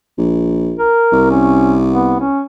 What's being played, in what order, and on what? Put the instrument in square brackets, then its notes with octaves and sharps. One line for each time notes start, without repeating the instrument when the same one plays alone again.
[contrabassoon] A#1
[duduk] A#4
[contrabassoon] C2
[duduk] C#4
B3
C#4